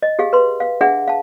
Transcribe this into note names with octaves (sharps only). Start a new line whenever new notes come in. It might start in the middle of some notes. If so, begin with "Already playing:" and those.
D#5
G4 G#4 F5
B4 C6
F5
D4 G#4 E5 F#5
F5 A5